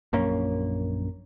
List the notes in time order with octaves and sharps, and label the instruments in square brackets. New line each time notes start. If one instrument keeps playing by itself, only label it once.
[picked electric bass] A#1 F#2 A#3 C#4